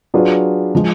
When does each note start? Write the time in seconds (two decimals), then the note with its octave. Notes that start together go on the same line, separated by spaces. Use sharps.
0.14 F#3 D4 F4 G#4 B4
0.75 F3 G#3